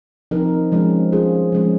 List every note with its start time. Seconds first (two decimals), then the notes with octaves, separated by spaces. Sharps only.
0.31 F3 C4 D#4 A#4
0.72 F3 G#3 C#4
1.12 G3 C#4 F4 G#4
1.52 F3 G#3 C#4